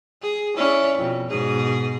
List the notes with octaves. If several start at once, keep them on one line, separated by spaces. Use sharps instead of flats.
G#4
C#4 E4 D5
F2 B2
G#2 B2 G#4